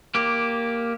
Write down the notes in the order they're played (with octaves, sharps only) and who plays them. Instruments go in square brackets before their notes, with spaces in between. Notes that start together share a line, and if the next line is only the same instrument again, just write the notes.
[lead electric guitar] A#3 G4